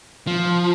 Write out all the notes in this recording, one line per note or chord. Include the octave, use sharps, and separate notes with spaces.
F3